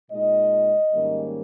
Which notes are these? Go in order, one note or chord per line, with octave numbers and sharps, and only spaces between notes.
A#2 G#3 D#4 D#5
G#2 D#3 G3 A#3 C#4